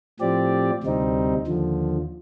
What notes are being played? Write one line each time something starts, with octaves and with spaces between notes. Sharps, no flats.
A2 F3 C4 G4 D5
D2 C3 G3 C4 D#4
D#2 D3 F3